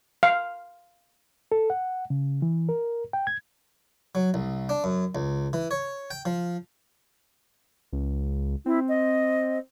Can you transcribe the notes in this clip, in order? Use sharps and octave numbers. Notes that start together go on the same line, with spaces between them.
F5
A4
F#5
C#3
E3
A#4
G5
G#6
F#3
C2
D4
F#2
C#2
E3
C#5
G5
F3
C#2
C4 E4
D#5